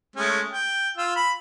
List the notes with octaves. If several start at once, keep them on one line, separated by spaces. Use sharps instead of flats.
G#3 A3 C#4
G5
F4 E6
B5